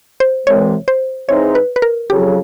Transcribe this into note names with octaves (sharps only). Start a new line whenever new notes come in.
C5
C2 C3 E3 G#3 C#5
C5
G#2 E3 G#3 C4 D#4 C#5
B4
B4
A#4
F2 C#3 F#3 G4